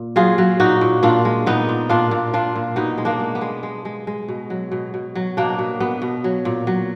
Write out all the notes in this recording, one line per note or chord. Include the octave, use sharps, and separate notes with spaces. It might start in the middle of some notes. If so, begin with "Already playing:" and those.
Already playing: A#2
F#3 F4 G#4
F#3
A#2 D#4 F#4
A#2
A#2 D4 F4
G#3
A#2 B3 D#4
A#2
A#2 D4 F4
A#2
A#2 D4 F4
A#2
B2 B3 D#4
G#3
A#3 D4
G#3
B3
G#3
G#3
G#3
G#3
B2
F#3
B2
B2
F#3
B2 A#3 D4
B2
B2 B3
B2
F#3
A#2
F#3